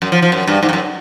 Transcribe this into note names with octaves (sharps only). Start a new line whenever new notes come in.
F#2
F3
F3
F#2
G2
G#2
G2
F#2